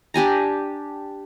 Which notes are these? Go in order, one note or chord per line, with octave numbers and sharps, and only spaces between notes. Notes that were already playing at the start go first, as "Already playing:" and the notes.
D4 G4 G#5 A#5